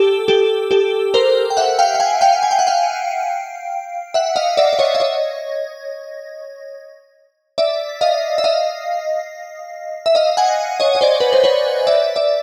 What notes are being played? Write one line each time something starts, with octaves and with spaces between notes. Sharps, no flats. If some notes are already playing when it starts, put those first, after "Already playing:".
Already playing: G4 A4
G4 A4
G4 A4
A#4 C5
G5
E5 F#5
F5 G5
G5
F#5 G#5
F5 G5
G#5
G5
F#5
F5 G5
E5 F#5
D#5 F5
D5 E5
D5
C#5 D#5
E5
C#5 D#5
D5 E5
D#5 F5
E5
D#5 F5
E5
D#5 F5
F#5 G#5
C#5 D#5
D#5
C5 D5
B4
C5
B4 C#5
D5 E5
D5 E5